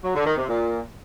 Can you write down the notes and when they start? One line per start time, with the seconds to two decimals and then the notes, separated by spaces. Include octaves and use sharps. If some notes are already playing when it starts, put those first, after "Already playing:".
0.02 F#3
0.14 D3
0.25 D#3
0.36 C3
0.47 A#2